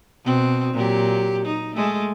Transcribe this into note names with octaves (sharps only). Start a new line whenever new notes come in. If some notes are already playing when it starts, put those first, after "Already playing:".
B2 C4
A#2 F#3 G4
D#4
G#3 A3